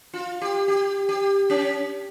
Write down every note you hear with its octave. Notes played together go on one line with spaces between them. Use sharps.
F4
G4
G4
G4
C#4